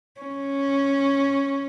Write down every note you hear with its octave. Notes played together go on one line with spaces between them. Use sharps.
C#4